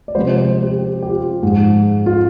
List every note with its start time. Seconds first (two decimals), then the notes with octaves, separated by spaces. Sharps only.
0.08 D5
0.15 C3 F3 G#3 C5
0.31 C5
0.63 G4
0.79 G4
1.02 G4
1.11 F4
1.43 G#2 F3 G#3
2.06 F4